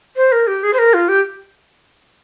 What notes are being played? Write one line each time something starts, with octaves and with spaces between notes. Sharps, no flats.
C5
A#4
G4
G#4
C5
A#4
F4
G4